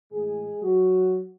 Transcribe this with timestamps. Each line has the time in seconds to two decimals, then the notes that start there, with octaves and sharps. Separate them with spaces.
0.11 A2 E3 G#3 G#4
0.62 F#3 F#4